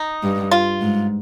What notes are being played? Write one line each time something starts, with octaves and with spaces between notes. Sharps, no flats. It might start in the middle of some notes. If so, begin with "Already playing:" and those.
Already playing: D#4
G2
F4
G#2